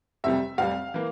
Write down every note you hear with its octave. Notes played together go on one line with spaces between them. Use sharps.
F1 F2 C3 G3 E5
F1 F2 C3 G3 F5
E3 A#3